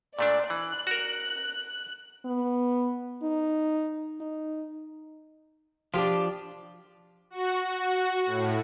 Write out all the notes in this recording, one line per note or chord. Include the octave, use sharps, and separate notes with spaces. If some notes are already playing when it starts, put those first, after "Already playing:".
A#2 A3 D4 D5
E3 F#6
F#4 A#4
B3
D#4
D#4
F3 D4 F4 G4
F#4
F#4
A2